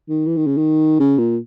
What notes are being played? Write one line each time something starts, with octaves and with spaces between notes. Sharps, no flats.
D#3
E3
D#3
C#3
D#3
C#3
A#2